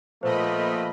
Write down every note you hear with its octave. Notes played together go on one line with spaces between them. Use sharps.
A#2 F3 A3 B3 C5 D#5 B5